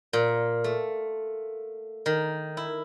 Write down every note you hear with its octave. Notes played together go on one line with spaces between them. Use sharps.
A#2
A3
D#3
E4